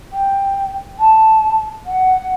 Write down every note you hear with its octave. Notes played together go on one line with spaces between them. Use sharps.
G5
A5
F#5